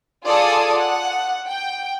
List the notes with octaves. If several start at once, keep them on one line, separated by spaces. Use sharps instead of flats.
F4 G#4 A4 D5 A5 D#6
F#5
G5